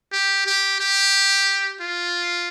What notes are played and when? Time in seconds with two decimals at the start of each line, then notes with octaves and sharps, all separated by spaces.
0.12 G4
0.46 G4
0.80 G4
1.81 F4